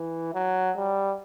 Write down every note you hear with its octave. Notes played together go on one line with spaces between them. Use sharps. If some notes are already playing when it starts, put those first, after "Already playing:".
Already playing: E3
F#3
G3